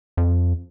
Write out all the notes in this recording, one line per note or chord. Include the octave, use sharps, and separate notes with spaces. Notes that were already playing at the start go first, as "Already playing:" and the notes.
F2